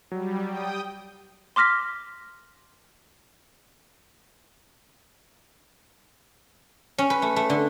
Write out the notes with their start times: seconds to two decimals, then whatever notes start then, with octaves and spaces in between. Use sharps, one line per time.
0.12 F#3 G3
0.47 G5 D#6
1.56 C6 D6 F6 A#6 B6
6.98 C#4
7.10 B4
7.22 A3
7.36 A3
7.50 D3